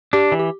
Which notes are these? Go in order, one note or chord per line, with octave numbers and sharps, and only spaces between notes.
D4 G4
E3
G4